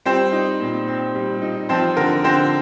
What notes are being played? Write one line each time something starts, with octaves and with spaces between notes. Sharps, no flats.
G3 C4 C5
D#4
A#2
C4
G3
D#4
F3 C4 C5
D3 A#4
D3 C4 C5